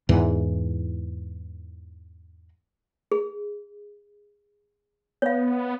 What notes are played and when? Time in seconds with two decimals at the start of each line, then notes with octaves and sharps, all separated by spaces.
0.09 E2 G#2 E3
3.12 G#4
5.22 B3 C#5 F5